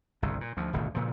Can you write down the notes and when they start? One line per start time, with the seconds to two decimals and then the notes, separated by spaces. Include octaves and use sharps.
0.22 G1 C2 C#3
0.41 A#2
0.57 D2 F3
0.73 D#1 G#1 D2 B2
0.95 A#2 C#3 F3